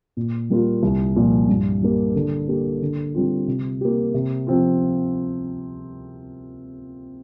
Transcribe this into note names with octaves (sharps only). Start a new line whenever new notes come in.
A#2
G3 A#3 F4
C2
A#2 F3
G2
G3 A#3 G4
D3
A#3 G4
D3
G3 C4 F4
C3
A#3 G4
C3
F3 C4 F4